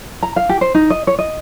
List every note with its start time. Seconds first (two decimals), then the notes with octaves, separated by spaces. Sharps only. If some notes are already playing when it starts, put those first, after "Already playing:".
0.23 A#5
0.36 F5
0.49 G4
0.61 C5
0.75 D#4
0.90 D#5
1.07 C#5
1.19 D#5